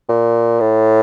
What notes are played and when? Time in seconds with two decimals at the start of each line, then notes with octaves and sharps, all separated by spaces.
0.09 A#2
0.60 A2